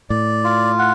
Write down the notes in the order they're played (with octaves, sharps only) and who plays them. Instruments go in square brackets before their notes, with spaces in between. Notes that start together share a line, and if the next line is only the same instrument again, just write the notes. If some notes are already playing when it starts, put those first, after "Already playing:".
[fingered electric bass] A2 [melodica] D5
[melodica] F4
F#5